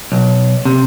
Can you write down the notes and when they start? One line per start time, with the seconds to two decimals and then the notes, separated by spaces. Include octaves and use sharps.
0.12 B1
0.65 C3